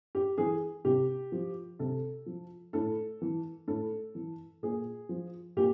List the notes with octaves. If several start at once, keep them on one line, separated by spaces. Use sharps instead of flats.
G4
E3 G#4
C3 G4
F3
C3 A4
F3
A2 A4
E3
A2 A4
E3
A#2 G#4
F3
A#2 G4